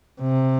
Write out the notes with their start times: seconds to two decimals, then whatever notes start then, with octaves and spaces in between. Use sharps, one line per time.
0.21 C3